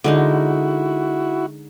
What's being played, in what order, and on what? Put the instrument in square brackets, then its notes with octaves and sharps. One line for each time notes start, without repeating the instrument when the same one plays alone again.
[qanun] D3 G#3 D#4 [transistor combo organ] E4 F#4